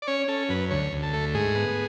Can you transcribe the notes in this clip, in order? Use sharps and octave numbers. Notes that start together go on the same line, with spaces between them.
D5
C#4 C#5
C#4 A4
F#2 B4
D2 C#5
D2
A4
A3
G#2 G#4
B3